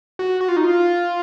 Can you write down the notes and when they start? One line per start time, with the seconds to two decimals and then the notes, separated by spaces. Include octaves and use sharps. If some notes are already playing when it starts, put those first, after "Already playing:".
0.19 F#4
0.41 F#4
0.48 F4
0.57 D#4
0.64 F4